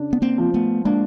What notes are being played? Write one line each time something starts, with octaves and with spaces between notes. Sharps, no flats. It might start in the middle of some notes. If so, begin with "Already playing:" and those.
Already playing: C#3 D4
B3
A#3 C4
F3
A3 B3
G#3 A#3 D4